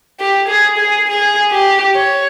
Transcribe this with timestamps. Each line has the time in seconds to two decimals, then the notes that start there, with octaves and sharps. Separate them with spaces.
0.20 G4
0.48 G#4
0.78 G#4
1.08 G#4
1.51 G4
1.95 C#5